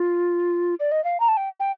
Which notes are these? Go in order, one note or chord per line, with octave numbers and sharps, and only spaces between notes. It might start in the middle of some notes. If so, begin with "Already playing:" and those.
Already playing: F4
D5
D#5
F5
A#5
A5
G5
G5